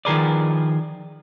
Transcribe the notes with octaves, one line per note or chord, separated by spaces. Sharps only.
D#3 F3 G#4 A#4 B4 D5